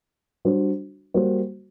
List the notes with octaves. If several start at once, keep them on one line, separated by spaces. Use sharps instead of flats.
G3 D4 F#4 C5
G3 A#3 F#4 C5